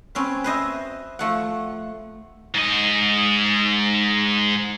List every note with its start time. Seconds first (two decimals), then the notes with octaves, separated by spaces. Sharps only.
0.15 C4 C#4 B4
0.44 B4 C5 D#5 E5
1.19 F3 A3 F#5
2.54 G#2 D#5